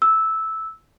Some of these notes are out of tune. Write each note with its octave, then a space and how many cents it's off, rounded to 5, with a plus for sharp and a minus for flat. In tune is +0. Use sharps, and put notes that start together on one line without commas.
E6 -10